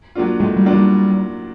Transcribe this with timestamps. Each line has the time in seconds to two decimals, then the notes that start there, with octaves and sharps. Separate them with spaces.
0.15 F#3 A#3 D4 F4
0.39 A2 G#3
0.57 G3
0.65 F#3 A#3 D4 F4
0.73 G3